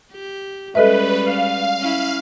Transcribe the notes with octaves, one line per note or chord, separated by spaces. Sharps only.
G4
G3 G#3 C#4 A4 B4 D#5 E5
F5
C#4 E4